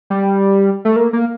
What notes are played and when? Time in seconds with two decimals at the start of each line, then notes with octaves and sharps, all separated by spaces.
0.10 G3
0.85 A3
0.96 A#3
1.13 A#3